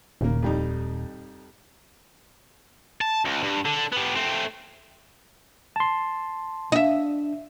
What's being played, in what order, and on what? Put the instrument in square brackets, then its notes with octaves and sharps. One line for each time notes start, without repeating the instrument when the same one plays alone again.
[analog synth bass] D#1 [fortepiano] C#3 A#3
[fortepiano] F2 G3 D#4
[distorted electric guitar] A5
C#2
G2
D3
B3 G4
A3 C4
[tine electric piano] A5 C6
[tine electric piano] D4 [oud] D#5 E5